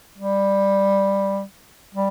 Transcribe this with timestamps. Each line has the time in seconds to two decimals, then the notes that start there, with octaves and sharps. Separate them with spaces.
0.18 G3
1.95 G3